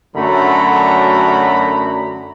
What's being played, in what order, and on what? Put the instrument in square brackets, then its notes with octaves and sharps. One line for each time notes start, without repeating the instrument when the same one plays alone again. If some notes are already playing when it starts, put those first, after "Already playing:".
[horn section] F#2 D3 F#3 A3 A#5 B5